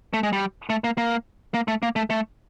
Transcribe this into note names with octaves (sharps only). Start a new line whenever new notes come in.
A3
G#3
G3
A3
A#3
A#3
A#3
A3
A#3
A3
A3